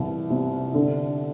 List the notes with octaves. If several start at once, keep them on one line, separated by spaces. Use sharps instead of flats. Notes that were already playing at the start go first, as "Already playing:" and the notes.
Already playing: C2 E3
C3
D3